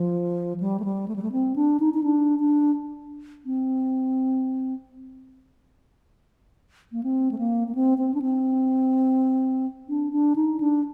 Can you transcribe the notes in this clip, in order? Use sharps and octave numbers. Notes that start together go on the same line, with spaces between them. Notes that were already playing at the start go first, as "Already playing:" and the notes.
Already playing: F3
G3
A3
G3
A3
G3
A3
C4
D4
D#4
D#4
D4
D4
C4
A#3
C4
A3
A#3
A#3
C4
C4
D4
C4
D4
D4
D#4
D4